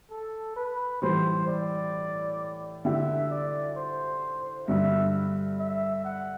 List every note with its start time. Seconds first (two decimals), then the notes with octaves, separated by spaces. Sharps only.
0.11 A4
0.56 B4
1.02 A2 E3 G3 C5
1.48 D5
2.85 D3 A3 E4 G4 E5
3.31 D5
3.77 C5
4.68 G2 D3 G3 E5
5.59 E5
6.05 F#5